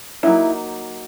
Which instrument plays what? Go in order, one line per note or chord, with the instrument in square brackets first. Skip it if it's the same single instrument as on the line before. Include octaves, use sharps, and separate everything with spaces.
[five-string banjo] F#3 A#3 D#4 E4